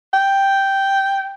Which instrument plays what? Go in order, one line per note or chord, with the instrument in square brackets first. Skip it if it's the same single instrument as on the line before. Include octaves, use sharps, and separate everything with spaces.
[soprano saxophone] G5